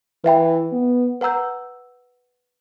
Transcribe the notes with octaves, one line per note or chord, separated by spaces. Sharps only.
E3 B4 E5 G5 B5
B3
B4 F#5 A#5 E6 G6